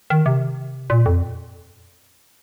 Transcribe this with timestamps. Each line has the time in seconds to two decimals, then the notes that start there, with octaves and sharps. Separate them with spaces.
0.10 D#3
0.26 C3
0.90 A#2
1.06 F2